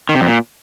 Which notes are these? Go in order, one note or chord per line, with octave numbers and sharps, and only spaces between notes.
D#3
C3
F2
A#2